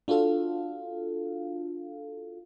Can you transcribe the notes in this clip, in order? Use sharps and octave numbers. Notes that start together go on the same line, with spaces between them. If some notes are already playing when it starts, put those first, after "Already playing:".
D4 F4 F#4 A4 F5